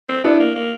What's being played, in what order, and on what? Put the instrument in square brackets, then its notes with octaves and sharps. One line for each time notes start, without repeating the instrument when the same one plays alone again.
[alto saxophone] C4
[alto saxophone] B3 [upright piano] D4 E4
[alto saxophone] A#3
A#3